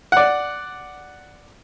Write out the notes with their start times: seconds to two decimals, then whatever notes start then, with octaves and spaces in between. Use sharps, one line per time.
0.12 D5 F#5